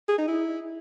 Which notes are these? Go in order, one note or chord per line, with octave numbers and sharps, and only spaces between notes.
G#4
D#4
E4